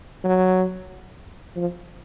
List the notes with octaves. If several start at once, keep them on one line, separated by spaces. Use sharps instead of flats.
F#3
F3